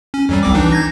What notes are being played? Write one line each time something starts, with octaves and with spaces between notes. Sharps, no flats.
C#4
F2 F#3 G3
C2 C4 D6
E3 D4 D#4
G6 G#6 A#6